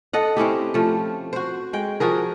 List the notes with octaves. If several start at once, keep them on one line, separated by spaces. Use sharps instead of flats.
A4 D#5 F#5
C4 C#4 E4 G4
F3 A3
F#4 C5
G#3 G5
F3 F#4 G#4 A#4